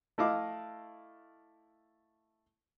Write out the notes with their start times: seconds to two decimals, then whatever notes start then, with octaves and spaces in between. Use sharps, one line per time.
0.18 A3 E4 D#5 F5 D6